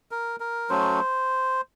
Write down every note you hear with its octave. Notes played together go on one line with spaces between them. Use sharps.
A#4
A#4
F#3 A3 C#4 C5